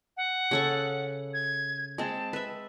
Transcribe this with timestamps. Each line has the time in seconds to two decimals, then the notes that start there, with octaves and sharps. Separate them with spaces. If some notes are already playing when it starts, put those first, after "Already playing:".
0.17 F#5
0.51 C#3 A4 C#6
1.34 G#6
1.98 G#3 C4 A5
2.33 B4 E5